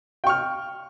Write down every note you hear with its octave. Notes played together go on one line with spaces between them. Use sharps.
G5 C#6 F6